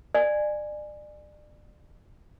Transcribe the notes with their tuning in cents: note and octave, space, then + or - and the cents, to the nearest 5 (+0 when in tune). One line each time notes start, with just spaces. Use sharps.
D5 +35 G#5 +0